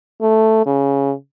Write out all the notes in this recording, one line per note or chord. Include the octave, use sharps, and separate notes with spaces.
A3
C#3